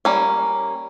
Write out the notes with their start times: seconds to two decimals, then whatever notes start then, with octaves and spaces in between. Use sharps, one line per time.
0.05 G3 A#3 C#4